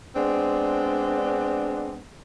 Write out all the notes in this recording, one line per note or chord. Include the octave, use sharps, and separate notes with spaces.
G#3 B3 C4 D4